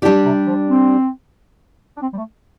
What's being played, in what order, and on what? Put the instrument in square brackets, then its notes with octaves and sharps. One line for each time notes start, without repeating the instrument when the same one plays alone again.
[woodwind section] A2 [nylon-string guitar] G3 D4 G4 D5
[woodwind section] C3
F3
C4
D4
C4
G3
A3